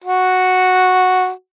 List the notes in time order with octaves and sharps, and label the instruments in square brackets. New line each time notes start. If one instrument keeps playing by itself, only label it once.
[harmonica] F#4